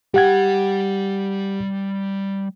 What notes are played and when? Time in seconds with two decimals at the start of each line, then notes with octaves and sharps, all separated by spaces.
0.14 G3 G4 F#5 G5 G#6